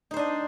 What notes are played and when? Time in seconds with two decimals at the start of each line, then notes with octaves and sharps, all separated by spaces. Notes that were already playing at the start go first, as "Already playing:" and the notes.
0.11 D#4
0.14 C5
0.16 D4
0.19 D#5